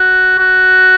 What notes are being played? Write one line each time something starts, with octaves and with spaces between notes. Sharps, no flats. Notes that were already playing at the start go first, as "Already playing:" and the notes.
Already playing: F#4
F#4